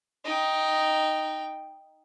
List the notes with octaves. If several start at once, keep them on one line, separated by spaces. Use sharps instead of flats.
D#4 G5